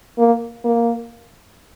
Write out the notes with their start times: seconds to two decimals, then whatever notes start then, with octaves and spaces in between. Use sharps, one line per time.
0.18 A#3
0.64 A#3